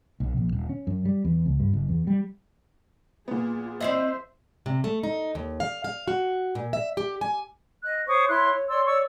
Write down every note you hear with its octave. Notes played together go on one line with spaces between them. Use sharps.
B1
A#1
D#1
C#4
F#2
G3
E2
C#2
G2
F#1
E2
G3
A#2 B3 F4 G#4
C4 E4 C5 D#5 E5
C3
A3
D#4
D#2
F5
F5
F#4
A#2
E5
G4
G#5
D#5 F#6
C5 C#5 C#6 D#6
E4 C#5 C6 F#6
C#5
C#5 D5 C6 E6
C#5 D5 C#6 E6